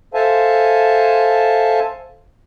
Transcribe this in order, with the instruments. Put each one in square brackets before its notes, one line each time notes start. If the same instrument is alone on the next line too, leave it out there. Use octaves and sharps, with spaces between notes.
[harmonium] A4 C5 E5 F5 G#5 A5